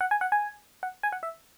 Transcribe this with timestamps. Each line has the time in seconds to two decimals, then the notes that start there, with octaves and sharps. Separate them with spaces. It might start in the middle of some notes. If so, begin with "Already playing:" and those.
0.01 F#5
0.11 G#5
0.21 F#5
0.32 G#5
0.83 F#5
1.03 G#5
1.12 F#5
1.23 E5